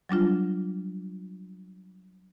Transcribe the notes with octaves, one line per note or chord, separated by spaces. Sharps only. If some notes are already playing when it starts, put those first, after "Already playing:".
F#3 G3 D4 F4